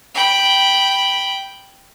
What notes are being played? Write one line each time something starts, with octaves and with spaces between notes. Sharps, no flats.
G5 B5